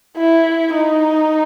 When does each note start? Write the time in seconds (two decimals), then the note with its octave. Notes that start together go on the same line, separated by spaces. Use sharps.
0.17 E4
0.75 D#4